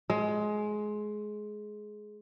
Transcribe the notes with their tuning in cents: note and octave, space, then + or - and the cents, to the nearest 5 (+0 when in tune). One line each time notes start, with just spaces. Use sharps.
G#3 +20